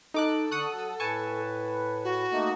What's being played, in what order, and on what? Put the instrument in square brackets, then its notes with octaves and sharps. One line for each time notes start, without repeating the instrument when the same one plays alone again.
[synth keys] D#4 D6 F#6 [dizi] A4
[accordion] D3 C#6 [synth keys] F#5 D#6 F#6
[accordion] F#3
[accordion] A2 B4 [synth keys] G#5 A5 C#6
[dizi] F#4
[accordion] A3 A#3 D#4